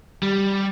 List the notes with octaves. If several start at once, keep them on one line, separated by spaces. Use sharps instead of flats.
G3